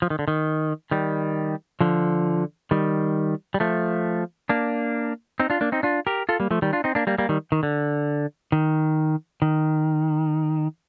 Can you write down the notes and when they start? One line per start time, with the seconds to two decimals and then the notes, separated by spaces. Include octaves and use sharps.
0.02 F3
0.10 D#3
0.19 D3
0.28 D#3
0.91 D#3 G3
1.80 D3 F3
2.71 D#3 G3
3.54 G3
3.60 F3 A3
4.49 A#3 D4
5.40 C4 D#4
5.50 D4 F4
5.61 A#3 D4
5.72 C4 D#4
5.83 D4 F4
6.07 G4 A#4
6.29 F4 A4
6.40 G3 A#3
6.51 F3 A3
6.62 D#3 G3
6.73 D4 F4
6.84 C4 D#4
6.95 A#3 D4
7.07 G3 A#3
7.18 G3 A#3
7.29 D#3 G3
7.52 D#3
7.63 D3
8.52 D#3
9.42 D#3